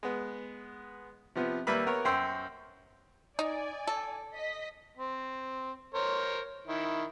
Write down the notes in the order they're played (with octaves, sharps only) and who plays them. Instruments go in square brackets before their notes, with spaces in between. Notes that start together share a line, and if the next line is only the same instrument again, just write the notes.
[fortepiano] G#3 B3
C3 F3 B3
D#2 G3 A#3 B4 E5 B5
B3 A#4 C#5
F#2 C5 G5 E6
[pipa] D#4 [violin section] D5 G#5
[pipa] A4
[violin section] D#5 B6
[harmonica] C4
A#4 C5 C#5
D#3 E4